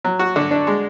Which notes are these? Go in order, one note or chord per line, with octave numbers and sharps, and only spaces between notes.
F#3
F#4
D3
D4
G#3